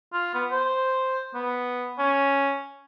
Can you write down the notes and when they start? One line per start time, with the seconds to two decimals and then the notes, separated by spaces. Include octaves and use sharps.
0.13 F4
0.35 B3
0.51 C5
1.34 B3
1.99 C#4